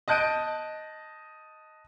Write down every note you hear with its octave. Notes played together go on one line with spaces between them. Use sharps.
D#5 A5 F#6 G6 D7 D#7